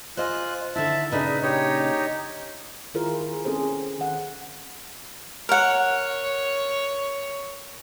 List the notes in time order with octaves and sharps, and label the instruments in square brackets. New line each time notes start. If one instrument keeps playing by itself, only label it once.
[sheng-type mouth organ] F4 F#6 [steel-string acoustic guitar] C5 D#5 G#5
[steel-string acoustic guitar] D3 D#3 E4 [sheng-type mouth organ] E5 A5
[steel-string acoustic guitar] A#2 C#3 D4 [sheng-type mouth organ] D#4 B4
[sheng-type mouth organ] D#4 G4 C#5
[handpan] D#3 E4 F4 G#4 A#4 C5
G#4
C4 C#4 G#4 A4 C5
D#3 F#5
[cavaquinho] A#4 F#5 [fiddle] C#5